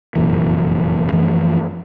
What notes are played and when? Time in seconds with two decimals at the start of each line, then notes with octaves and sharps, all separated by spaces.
0.15 F1 F#2 A#2 E3
1.12 F#2 E3 F3 A3